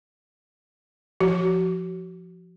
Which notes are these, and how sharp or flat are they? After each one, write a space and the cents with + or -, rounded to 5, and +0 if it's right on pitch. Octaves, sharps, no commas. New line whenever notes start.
F3 +0 F#4 +35